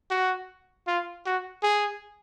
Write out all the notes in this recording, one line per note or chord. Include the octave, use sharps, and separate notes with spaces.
F#4
F4
F#4
G#4